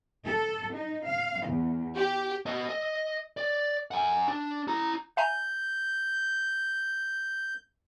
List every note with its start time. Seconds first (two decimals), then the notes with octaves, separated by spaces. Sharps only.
0.24 A4
0.75 D#4
1.07 F5
1.47 E2
1.96 G4
2.46 B3 D#5
2.69 D#5
3.37 D5
3.91 F#5 G#5
4.28 D4
4.68 E4 A#5
5.17 E5 G#5 A#5 G6